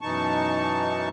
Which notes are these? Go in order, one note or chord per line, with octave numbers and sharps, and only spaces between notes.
F#2 B2 E3 D#4 A5 C#6